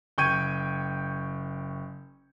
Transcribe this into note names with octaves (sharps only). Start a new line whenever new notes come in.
F#1 G5 C#6 G6 G#6 D#7